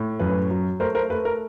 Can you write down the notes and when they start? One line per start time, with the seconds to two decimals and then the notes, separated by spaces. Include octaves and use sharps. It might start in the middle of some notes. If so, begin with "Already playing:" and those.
Already playing: A2
0.19 F#2 B4
0.51 F#3
0.80 A3 A#4 C5
0.95 A#4 C5
1.10 A3 B4
1.25 A#4